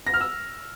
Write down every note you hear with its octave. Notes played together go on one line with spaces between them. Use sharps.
A#6
F6
E6